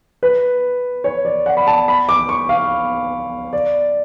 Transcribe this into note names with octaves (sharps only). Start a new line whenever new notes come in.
B4
C#5
D5
F#5
B5
A5
B5
D6
C#6
F5
D5